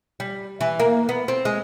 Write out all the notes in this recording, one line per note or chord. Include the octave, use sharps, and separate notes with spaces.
G3
E3
A#3
B3
C4
G#3